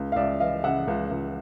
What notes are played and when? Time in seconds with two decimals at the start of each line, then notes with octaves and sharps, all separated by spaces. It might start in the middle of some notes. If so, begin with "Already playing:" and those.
Already playing: C#2
0.12 F5
0.16 C#2 D5 E5
0.40 E3 D#5 F5
0.64 C#3 E5 F#5
0.88 C#2
1.11 C#2